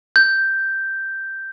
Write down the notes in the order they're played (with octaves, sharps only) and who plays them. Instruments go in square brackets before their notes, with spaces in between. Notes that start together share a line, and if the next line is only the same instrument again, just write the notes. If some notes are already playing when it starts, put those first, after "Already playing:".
[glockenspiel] G6